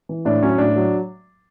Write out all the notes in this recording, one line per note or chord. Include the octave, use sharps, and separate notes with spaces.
E3
A2 D4
F#3 C#4
A2 D4
F#3